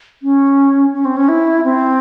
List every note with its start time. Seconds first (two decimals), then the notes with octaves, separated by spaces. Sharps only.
0.23 C#4
0.93 C#4
1.05 C4
1.17 C#4
1.29 E4
1.64 C4